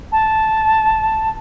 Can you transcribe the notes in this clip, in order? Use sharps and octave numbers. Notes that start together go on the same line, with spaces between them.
A5